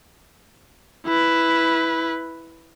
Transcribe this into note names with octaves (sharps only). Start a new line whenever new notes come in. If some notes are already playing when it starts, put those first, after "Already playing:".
E4 B4